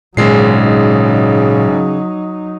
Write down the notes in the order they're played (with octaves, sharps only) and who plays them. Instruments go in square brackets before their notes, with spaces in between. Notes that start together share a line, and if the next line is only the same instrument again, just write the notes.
[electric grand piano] G#1 G#3 C7 [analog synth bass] A#2 [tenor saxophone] C#3 [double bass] F#3 D#4